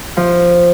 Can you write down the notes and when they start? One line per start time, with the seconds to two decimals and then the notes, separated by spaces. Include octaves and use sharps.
0.17 F3